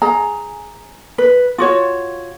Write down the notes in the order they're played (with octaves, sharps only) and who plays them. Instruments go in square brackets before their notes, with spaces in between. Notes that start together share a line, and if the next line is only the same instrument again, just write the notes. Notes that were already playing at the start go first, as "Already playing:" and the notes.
[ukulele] G#4 A#5
B4
F4 F#4 C#5